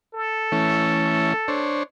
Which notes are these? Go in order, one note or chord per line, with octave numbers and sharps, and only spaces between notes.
A4
E3 A3 C#4
D4 C5 C#5